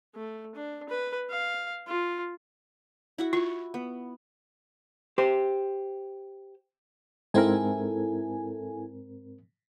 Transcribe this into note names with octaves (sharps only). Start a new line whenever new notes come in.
A3
D4
B4
F5
F4
E4 F#4 F#5
F4 C#6
B3
G4 C5
G#2 C4 E4 A4 A#4 G#5